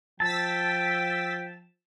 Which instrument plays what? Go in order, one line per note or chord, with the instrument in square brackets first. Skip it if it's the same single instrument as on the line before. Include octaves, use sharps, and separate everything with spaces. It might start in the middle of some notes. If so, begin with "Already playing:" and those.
[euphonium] F3 [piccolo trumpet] G5 [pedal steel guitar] A5 [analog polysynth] E6 A6 B6